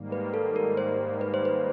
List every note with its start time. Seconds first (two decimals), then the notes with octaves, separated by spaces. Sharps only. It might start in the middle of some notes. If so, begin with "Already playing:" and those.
Already playing: G#2 D#3 G3 A#3
0.12 B4
0.34 A4
0.56 A#4
0.77 C5
1.21 B4
1.34 C5
1.45 B4